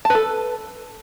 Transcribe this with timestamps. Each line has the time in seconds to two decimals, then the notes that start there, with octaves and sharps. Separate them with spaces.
0.05 A5
0.10 B4
0.15 A4